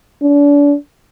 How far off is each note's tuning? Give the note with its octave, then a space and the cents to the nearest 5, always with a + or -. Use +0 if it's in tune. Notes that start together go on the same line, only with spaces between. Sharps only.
D4 -35